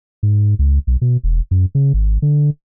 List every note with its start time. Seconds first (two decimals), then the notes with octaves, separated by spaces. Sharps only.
0.23 G#2
0.59 C#2
0.87 B1
1.01 B2
1.24 E1
1.51 F#2
1.75 C#3
1.94 G#1
2.22 D3